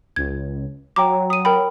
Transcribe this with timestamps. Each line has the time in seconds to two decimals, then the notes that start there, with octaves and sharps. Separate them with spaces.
0.16 C#2 G#6
0.96 F#3 G5 A#5 D6
1.30 D#6 D#7
1.45 A#4 G5 B5